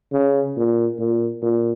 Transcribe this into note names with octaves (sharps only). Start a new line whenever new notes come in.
C#3
A#2
A#2
A#2